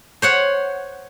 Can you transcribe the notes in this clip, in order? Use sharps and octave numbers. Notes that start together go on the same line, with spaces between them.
C5 C#5 F#5